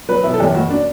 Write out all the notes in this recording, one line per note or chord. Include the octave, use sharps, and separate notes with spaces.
F#3 B4
B2 E4
A4
F#2 G4
F#1 F#4
D4